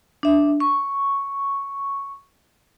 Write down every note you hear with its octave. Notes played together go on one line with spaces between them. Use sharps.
D4 E5
C#6